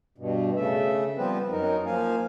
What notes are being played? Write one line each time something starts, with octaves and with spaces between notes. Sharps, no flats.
G2 B2
C#3 A3 E5
F3 G3 B3 C4 B4
F#2 D#4 A#4
F3 A#3 F5 G#5